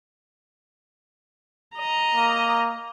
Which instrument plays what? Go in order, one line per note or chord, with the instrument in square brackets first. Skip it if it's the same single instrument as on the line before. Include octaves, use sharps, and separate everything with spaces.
[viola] D#5 A#5
[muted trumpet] A#3